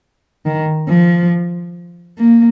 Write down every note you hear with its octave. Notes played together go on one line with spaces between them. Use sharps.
D#3
F3
A#3